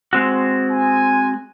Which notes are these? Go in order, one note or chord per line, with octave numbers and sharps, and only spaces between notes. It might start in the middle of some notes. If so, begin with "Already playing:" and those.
G#3 C4 F#4
G#5